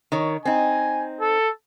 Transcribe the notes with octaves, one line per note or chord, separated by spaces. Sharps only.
D#3 C#5
C4 D#4 G#5
A4